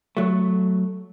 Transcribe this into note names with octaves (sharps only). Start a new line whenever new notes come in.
F#3 A3